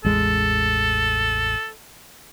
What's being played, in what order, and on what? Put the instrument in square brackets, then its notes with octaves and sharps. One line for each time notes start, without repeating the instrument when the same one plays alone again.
[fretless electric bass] A1 E2 G#3 [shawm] A4